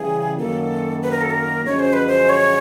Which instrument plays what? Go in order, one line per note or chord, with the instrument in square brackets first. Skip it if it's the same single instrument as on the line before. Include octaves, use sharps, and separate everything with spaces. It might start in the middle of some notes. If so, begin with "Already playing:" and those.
Already playing: [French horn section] C#3 E3 G3 [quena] G#4
[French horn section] F#2 D#3 F#3 A#3 [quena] A4
[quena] B4
A#4
A4
A#4
[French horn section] F#2 D3 F3 G#3 C#4 [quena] C#5
[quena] C5
B4
C5
C#5